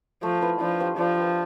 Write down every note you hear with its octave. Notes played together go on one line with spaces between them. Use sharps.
F3 A3
E4 B4 F5
F3 D4
G4 C5 F5
F3 D4
G4 B4 F5